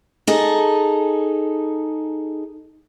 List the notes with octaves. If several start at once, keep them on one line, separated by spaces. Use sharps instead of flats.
D#4 G#4 A4